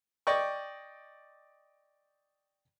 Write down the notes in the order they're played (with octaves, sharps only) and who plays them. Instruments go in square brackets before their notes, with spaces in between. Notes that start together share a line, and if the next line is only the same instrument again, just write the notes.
[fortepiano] D5 D#5 G5 C#6